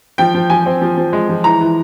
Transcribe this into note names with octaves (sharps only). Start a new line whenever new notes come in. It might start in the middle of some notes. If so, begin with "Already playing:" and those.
F3 G5
F3
F3 G#5
C4
F3
F3
G#3
F3
E3 A#5
E3